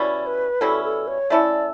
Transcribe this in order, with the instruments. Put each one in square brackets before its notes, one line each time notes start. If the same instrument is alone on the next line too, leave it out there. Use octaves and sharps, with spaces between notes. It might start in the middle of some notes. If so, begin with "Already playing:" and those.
Already playing: [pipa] B2 G3 C#4 E4 [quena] D5
[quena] B4
[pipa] B2 G3 C#4 E4 [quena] A4
[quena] A4
C#5
[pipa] A3 C#4 E4 A4 [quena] D5